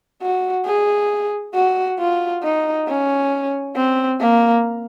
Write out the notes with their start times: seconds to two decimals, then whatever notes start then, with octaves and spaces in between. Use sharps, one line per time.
0.22 F#4
0.66 G#4
1.54 F#4
1.99 F4
2.43 D#4
2.88 C#4
3.76 C4
4.21 A#3